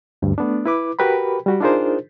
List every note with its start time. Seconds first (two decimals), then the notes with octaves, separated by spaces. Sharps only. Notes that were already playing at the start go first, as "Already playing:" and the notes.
0.22 D2 G2
0.38 A3 B3 D4
0.66 E4 B4 D6
0.99 F#4 G4 A#4 B4 G5 B5
1.46 G3 F#4 G4
1.61 D4 D#4 F4 G#4 A#4 C5